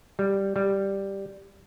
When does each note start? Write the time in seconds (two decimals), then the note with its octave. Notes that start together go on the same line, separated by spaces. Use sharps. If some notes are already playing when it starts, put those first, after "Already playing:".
0.19 G3
0.56 G3